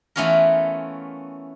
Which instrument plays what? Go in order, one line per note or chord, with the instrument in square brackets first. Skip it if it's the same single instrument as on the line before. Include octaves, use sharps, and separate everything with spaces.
[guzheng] E3 A3 B3 C#4 F4 A#4